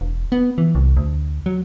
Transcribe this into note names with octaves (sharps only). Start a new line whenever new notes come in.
E1
B3
E3
C2
D2
F#3